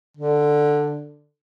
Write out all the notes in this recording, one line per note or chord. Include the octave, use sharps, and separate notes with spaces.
D3